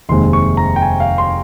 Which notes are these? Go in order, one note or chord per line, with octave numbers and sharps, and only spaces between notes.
F1 D#2 D#3 G#3 C4 C6
C#6
A#5
G5
G#5
F5
C6